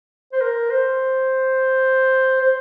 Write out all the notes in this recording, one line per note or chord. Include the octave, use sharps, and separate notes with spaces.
C5
A#4
C5
C5